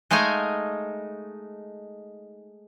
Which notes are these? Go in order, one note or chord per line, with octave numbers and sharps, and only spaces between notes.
G#3 A3 D#4 F5 G#5